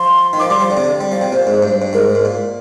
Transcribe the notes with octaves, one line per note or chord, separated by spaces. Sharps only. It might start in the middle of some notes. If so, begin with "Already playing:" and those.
Already playing: F3 C6
D#3
F3 D6
G3 C6
F3
D3 D5
C3
D3
G3
F3
C3
A#2 C5
G#2
G2
G2
G#2 A#4
G#2
A#2